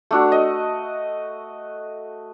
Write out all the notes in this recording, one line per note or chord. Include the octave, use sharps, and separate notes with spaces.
A3 D4 F#4
D#5